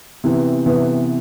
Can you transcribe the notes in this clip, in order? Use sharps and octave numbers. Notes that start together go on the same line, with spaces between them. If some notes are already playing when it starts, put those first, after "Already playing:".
C3 E3 B3
C3 E3 B3